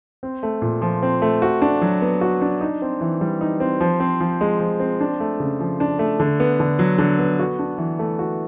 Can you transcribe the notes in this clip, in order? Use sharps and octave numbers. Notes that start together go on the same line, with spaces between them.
C4
A3
A#2
F3
C4
A3
F#4
D4
F#3
B3
F#4
D4
D#4
C4
E3
G3
D#4
C4
F3
C4
F3
G#3
F3
C4
D4
A3
C#3
F3
D4
A3
D3
B3
D3
F#3
D3
B3
F#4
D4
E3
A3
F#4